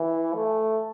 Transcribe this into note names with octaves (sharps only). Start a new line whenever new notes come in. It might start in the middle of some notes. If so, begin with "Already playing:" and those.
Already playing: E3
A3